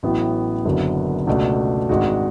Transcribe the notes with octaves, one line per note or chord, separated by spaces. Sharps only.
A1 A2 F#3 B3
F#1 F#2 D3 F#3 B3
C#2 B2 A3 D4
G#1 G#2 G#3 D4 F#4